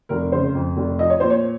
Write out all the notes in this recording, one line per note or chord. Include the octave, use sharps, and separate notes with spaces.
F1 A#4
C#3 C5
F2
F1
F3 D#5
C#5
A#2 C5
C#5